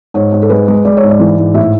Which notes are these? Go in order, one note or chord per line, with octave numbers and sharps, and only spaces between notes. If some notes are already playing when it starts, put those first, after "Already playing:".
G#2 C#5
G#2
A4
G#3 B4
G#3
G#3 D5
C#5
G#2
D5
E3
G#2
A2 E5